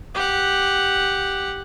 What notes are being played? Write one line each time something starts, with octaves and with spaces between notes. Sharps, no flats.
G4 F#5